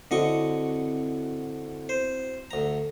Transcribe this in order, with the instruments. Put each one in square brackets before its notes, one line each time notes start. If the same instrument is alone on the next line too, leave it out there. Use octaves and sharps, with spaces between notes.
[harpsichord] D3 D#5 C#6 [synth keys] C4 E4 F#4
[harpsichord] C5
D2 A#5